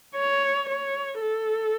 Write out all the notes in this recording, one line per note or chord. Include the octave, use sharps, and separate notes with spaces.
C#5
C#5
A4